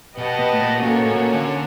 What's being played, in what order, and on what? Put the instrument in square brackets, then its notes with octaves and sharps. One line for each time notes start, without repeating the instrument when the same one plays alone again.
[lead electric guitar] B2 [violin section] G4 B4 D#5 F#5 A5
[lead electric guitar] B2
A2
A#2
[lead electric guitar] A#2 [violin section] A#3 C#4 F#4 A4 C#5
[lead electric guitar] A2
A#2
D3